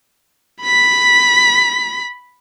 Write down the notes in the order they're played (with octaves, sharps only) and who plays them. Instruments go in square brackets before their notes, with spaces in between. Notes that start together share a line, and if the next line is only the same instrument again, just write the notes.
[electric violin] B5 B6